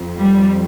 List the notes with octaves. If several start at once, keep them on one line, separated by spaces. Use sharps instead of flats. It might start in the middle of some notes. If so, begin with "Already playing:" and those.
Already playing: F2
G3